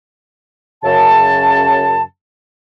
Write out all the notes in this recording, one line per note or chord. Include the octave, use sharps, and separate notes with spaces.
F#2 C#3 A5